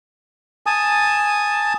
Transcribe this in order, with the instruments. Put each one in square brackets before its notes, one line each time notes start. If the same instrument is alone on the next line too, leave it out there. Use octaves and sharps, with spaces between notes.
[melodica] G#5 A5 D#6